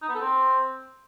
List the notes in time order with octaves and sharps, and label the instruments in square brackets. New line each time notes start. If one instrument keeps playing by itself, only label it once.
[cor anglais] D#4
B3
A4
C4